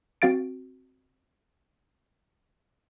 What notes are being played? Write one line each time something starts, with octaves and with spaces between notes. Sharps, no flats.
C4 F#4 F5 A6 D7